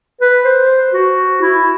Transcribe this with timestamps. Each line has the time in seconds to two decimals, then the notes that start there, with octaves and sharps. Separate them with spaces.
0.21 B4
0.45 C5
0.93 F#4
1.41 E4